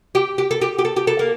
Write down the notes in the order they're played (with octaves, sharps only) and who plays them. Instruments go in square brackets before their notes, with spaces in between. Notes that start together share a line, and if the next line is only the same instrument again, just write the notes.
[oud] G4
G4
A4
G4
G4
A4
G4
A4
A#3